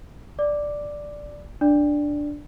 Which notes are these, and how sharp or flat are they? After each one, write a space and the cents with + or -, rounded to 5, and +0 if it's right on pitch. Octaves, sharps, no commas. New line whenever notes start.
D5 +0 D6 +0
D4 +0 D5 +0